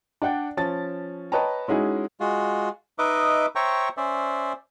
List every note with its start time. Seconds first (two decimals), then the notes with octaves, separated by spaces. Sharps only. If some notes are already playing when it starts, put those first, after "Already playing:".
0.22 D4 D5 F#5 G5
0.57 F3 C#4 A5 A6
1.32 B4 C#5 D#5 G5 A5 A#5
1.68 G#3 C#4 D#4 E4 F#4 G#4
2.20 G#3 F4 F#4
2.99 D#4 B4 D#5 E5 D6
3.55 C5 C#5 E5 G5 A#5 C#6
3.97 C#4 C5 D5 E5